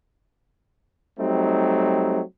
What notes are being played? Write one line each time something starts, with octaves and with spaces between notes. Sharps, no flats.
F#3 G3 A3 C4 D#4